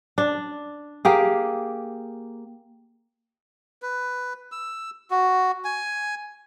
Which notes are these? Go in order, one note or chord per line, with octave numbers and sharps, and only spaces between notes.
D4
A#3 G4 G#4
B4
E6
F#4
G#5